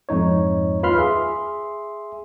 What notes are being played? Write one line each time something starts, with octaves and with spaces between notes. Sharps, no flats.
F2 G#2 D#4 C#5
D#2 F4 B4 B5 C6 F6
G#4 E5 C6